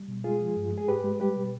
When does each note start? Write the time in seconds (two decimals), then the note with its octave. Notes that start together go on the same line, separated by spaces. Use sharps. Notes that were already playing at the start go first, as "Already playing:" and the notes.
Already playing: G3
0.08 B2
0.24 G#3 F4 G#4
0.41 F3
0.56 G2
0.73 G#3 G#4
0.88 G#2 G4 B4
1.04 G#3
1.20 G3 G4 B4
1.37 B2